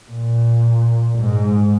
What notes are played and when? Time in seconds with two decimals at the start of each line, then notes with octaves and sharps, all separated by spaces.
0.11 A#2
1.19 G#2